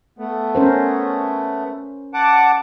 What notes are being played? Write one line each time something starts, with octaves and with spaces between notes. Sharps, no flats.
A3 B3
C#4 A#4 C5
F#5 A5 D6